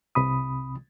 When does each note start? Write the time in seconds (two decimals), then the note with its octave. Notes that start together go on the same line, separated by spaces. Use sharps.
0.15 C2 C3 B5 D#6